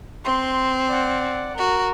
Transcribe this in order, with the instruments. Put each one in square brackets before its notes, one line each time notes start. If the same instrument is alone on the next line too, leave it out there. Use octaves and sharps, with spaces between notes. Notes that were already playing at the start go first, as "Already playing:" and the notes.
[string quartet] C4 [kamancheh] C6
[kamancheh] D5 F#5
[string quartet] F#4 [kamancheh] A#4